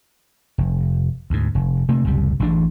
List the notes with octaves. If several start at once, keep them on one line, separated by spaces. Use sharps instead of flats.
F1
D2 G#2
F1
C3 A3 A#3
F#1 C#2 C3 G3
A1 E3 G3 D4